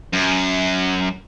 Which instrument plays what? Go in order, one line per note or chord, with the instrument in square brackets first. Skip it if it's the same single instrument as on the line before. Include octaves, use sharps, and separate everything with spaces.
[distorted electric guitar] F#2